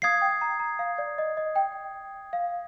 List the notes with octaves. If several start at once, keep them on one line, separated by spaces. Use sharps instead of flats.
F5 D#6 G#6 C7
G5
A#5
A#5
F5
D5
D#5
D#5
G5
F5